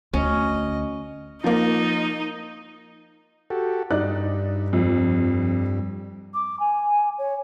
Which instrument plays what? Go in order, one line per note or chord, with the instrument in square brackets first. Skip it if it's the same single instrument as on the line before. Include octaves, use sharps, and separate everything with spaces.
[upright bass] D2 [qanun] C#4 [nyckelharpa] D#5
[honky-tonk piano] F3 A#3 [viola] D#4
[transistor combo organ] F#4 G4 A4
[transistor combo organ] G2 [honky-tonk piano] D#4 D5 F#6
[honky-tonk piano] F2
[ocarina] D6
G#5
C#5